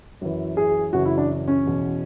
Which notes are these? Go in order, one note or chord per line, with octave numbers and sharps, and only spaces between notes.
F#2 E3
G#4
F#2 C#3 E3 F#4
E4
D4
C#4
E2 B2